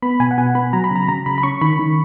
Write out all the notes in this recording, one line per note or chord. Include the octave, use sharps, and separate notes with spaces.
B3 B5
B2 G#5
F#5
B2 G#5
B3 B5
F#3 A#5
B5
C#3 A#5
C#3 A#5
C#3 B5
B5
C#4 C#6
D#3 B5
D#3